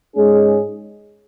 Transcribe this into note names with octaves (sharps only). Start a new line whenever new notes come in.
G#2 G#3 C#4 G#4